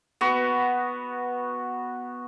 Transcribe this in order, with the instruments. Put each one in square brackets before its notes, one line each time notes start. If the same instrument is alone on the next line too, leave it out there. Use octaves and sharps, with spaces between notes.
[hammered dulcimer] B3 F#4 B4